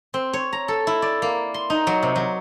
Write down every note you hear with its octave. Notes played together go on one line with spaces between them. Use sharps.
C4
C#5
A#5
A4
E4
D5
A#3
C6
D#4
F#3
C3
F#3